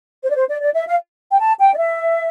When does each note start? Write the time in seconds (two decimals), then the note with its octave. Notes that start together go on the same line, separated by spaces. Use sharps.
0.22 C5
0.29 D5
0.36 C5
0.48 D5
0.60 D5
0.74 E5
0.87 F5
1.32 G5
1.39 A5
1.59 G5
1.73 D5
1.78 E5